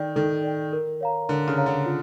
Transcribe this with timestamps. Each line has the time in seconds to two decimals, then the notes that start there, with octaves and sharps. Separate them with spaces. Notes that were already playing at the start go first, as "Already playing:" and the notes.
Already playing: D#3 A4 D5 G5
0.16 D#3 A4
0.44 D5 G5
0.73 A#4
1.01 C#5 F5 A#5
1.29 D3 A#4
1.48 C#3
1.58 C#5 F5 A#5
1.66 D3
1.86 F4